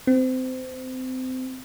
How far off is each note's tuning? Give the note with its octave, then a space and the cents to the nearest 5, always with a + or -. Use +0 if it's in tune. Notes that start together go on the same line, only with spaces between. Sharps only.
C4 -25